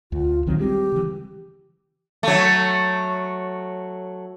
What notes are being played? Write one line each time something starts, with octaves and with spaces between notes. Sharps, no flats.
D2 F4
A#1 D#3 F#3 C4
G3 G#3 C4 G4
C#3 E3
F#3 A3